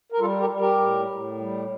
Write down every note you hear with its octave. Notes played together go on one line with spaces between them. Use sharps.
A#4
G3 F4 A4
G4 A#4
G3
G4 A#4
A2
A2
G3